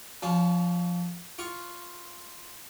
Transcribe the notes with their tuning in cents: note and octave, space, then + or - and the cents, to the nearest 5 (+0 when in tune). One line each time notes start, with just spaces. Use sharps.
F3 +5 C#4 +30
F4 +0 C#6 +5